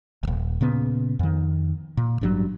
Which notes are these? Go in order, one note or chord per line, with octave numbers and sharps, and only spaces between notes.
D#1 G#1
A#2 C#3 B3
F2 D#3
A#2
A1 G2 F#3